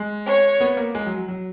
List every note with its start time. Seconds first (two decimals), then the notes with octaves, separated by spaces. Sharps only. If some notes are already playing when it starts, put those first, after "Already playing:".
Already playing: G#3
0.26 C#5
0.61 B3
0.77 A#3
0.95 G#3
1.06 F#3
1.17 F#3
1.28 F#3